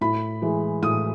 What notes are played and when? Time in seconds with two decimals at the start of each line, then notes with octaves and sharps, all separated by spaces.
0.01 A2 B5
0.42 E3 G#3
0.82 A2 D#6